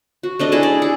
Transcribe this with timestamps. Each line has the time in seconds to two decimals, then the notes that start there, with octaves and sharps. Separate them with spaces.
0.23 F#4
0.39 A3 D4 D#5
0.52 E4 G#4 A5
0.63 D5
0.82 G#4